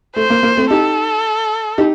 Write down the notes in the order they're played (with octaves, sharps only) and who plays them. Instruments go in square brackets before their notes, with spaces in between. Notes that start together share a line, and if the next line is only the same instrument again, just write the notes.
[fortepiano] A3 [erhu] C5
[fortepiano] A#3
A#3
A3 C4
[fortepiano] D#4 G4 [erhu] A4
[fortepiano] D#4 G4